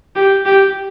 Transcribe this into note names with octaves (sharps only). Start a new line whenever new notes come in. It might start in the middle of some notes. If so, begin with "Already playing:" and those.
G4
G4